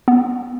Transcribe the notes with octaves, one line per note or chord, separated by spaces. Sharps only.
B3